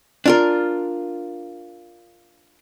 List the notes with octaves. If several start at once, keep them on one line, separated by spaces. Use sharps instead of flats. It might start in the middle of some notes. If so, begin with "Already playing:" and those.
D4 F4 A#4